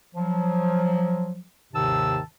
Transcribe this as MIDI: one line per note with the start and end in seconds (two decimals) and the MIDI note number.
0.15 1.40 53
0.15 1.40 54
1.73 2.19 39
1.73 2.19 44
1.73 2.19 48
1.73 2.19 51
1.73 2.19 81
1.73 2.19 88